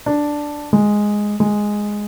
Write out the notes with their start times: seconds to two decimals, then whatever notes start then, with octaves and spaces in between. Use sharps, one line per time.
0.06 D4
0.73 G#3
1.40 G#3